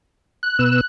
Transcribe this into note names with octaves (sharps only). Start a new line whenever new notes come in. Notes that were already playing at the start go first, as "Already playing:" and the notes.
F#6
B2 B3 E6